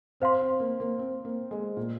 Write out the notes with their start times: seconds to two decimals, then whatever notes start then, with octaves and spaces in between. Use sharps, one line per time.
0.20 C4 C5 F5 C6
0.41 C4
0.60 A#3
0.80 A#3
0.99 C4
1.25 A#3
1.51 G#3
1.77 A#2